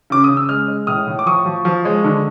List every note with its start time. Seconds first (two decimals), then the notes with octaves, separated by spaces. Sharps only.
0.10 C#3 D6
0.24 D#6
0.29 C#3
0.37 E6
0.49 G#3 D#6 F6
0.68 G#3
0.87 A2 D#6 F6
1.07 A2
1.19 D6
1.26 F3 C#6 D#6
1.46 F3
1.65 F3
1.85 G#3
2.04 D3